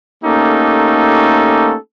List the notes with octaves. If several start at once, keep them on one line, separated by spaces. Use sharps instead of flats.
A3 A#3 C#4 D#4 G4 A4